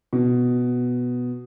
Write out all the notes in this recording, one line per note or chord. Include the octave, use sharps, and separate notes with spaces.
B2